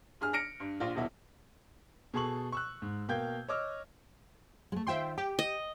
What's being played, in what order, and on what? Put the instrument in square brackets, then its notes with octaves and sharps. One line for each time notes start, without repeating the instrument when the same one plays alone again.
[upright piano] G2 G#4 F6
F6 A#6 C#7 D7
G2
A#1 F4
D#1 B2 E4
[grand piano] B2 G#4 A4 A5 C#6 F#7
C#6 E6 F#6
G#2
B2 A#3 F5 G5 G6 G#6
C#5 D#5 D6 E6 F6
[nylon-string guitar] G#3 A3
[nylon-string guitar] D#3 F4 C5 [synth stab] E5 G5 C6
[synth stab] G4 [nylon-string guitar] G5
[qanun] D#5